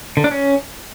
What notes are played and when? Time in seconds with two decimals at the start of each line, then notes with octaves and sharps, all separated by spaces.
0.17 D3
0.24 D4
0.31 C#4